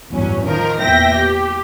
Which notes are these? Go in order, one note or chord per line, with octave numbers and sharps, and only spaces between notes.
A1 E2 G2 F#3 C#4
D#3 F3 A#4
E2 A#2 E5 G5 A#6
G4